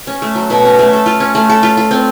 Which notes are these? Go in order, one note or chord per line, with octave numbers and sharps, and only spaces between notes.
C#4
A3
F#3
B2
C#4
A3
A4
F4
C#4
A3
A4
F4
F4
C4